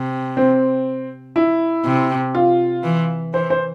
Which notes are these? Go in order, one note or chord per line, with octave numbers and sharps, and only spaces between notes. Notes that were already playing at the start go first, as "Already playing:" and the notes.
Already playing: C3
C4
E4
C3
F4
E3
E3 C5
C5